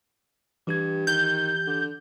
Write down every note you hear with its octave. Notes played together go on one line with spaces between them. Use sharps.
G2 E3 G4 G#6
D#3 G6
D3